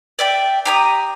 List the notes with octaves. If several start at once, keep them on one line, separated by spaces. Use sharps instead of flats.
D5 E5 G5
G4 A#5 D#6